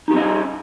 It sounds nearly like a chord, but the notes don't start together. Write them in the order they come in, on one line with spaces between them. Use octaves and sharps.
D#4 G4 C4 D#5 C#4